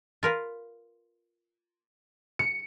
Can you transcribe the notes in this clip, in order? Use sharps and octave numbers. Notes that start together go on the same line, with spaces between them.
F4 A#4 B4
C#7